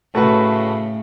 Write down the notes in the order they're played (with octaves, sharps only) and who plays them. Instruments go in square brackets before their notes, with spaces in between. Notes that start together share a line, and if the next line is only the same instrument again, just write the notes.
[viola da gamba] A2 C#3 [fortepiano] A3 F#4 B4